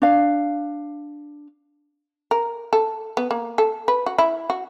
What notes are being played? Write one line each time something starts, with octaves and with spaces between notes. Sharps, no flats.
D4 F5
A#4
A4
B3
A#3
A4
B4
F#4
E4
F#4